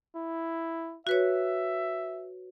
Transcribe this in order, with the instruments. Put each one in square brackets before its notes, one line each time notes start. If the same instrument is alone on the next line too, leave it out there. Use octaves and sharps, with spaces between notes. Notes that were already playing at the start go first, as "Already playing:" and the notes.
[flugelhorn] E4
[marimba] F#4 B4 C#5 [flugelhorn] E5